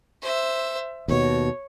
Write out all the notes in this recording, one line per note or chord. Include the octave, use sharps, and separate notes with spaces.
C5 E5
D#2 B2 C#5